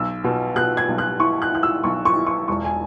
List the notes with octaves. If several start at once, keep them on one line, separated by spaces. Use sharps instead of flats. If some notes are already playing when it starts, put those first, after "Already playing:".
Already playing: B1 E6
B2
B2 F#6
G#6
B1
F#6
E4 C#6
F#6
E4 F#6
E6
B1 C#6
C#6
E4
C#6
E1 C#6
G#5